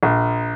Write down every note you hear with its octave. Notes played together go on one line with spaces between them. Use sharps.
A#1